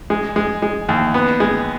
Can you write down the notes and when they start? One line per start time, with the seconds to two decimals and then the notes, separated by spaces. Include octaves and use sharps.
0.10 G#3
0.36 G#3
0.62 G#3
0.89 D#2
1.14 B3
1.40 G#3